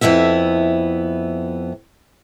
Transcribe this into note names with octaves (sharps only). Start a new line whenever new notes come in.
F2 D#3 B3 E4 E5